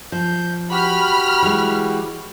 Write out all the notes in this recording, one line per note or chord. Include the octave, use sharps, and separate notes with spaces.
F3 G6
F#4 G4 B5 F6
E3 G#3